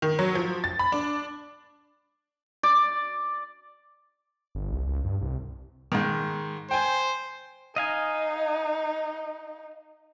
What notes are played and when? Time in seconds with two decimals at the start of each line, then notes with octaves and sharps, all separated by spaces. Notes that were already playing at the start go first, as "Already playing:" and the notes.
0.02 D#3
0.19 F#3
0.35 F3
0.64 A6
0.79 B5
0.92 D4
2.63 D5
4.55 G1
4.72 C2
4.87 C#2
5.04 G2
5.21 C2
5.92 G#2 D#3
6.71 C5 G5 G#5
7.76 D#4 D#5 F5 G#5